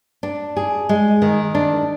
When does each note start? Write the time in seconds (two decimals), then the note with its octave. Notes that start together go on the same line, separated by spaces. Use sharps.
0.23 D4
0.57 G#4
0.89 G#3
1.22 D#3
1.55 D4